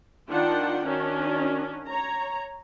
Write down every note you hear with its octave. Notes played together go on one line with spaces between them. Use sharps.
D#3 D4 F4 F#5 G5
D#3 C#4 D4 F#4
C#5 A#5